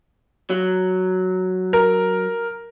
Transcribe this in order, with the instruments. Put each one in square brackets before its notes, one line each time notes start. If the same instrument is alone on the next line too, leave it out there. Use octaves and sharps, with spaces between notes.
[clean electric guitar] F#3
[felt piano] A#4